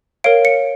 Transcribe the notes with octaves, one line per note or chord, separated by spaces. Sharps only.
A#4 C#5 F5 D7
C#7